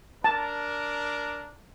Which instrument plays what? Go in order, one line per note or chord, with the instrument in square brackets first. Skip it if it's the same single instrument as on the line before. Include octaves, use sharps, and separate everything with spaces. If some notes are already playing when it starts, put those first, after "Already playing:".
[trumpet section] D4 A#4 [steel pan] A5